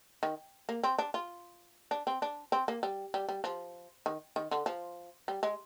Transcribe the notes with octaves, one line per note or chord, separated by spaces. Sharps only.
D#3
A#3
C4
D4
F4
D4
C4
D4
C4
A#3
G3
G3
G3
F3
D#3
D#3
D3
F3
G3
G#3